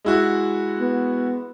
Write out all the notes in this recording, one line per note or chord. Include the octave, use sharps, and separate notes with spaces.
G#3 E4 F#4
B3